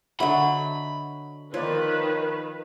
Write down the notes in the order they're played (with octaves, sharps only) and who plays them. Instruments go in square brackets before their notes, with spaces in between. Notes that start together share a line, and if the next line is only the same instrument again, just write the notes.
[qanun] D3 F#3 [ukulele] D#5 E5 F#5 [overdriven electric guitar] B5
[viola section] D#3 B4 [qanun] F3 [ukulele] C#5 D5